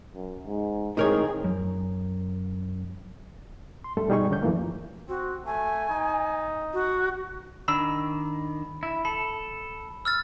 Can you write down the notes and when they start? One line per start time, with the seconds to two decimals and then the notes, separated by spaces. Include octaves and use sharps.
0.15 F#2
0.46 G#2
0.97 A2 D#3 G#3 C4 D#4 G#4 A#4 C#5
1.44 F#2
3.84 C6
3.97 G2 G3 A3 A4
4.09 B2 G3 D#4 G#4 C#6
4.31 D3 D#3 C#4 D4 G6
4.43 F#2 E3 F3 A3 A#3
5.09 C4 F#4
5.46 A3 G#5
5.90 D#4
6.73 F#4
7.68 D#3 D4 B5 E6
8.83 E4
9.05 A4 B5
10.05 E6 F6 A6